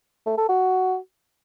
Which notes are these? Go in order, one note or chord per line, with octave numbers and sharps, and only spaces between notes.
A3
A4
F#4